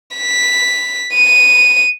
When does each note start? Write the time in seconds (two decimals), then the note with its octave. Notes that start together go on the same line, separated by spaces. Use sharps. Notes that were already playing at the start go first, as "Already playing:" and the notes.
0.16 B6
1.14 D#7